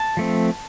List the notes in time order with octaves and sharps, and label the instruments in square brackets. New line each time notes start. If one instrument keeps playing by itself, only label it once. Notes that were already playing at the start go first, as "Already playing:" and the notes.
Already playing: [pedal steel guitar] A5
F3 A3 C4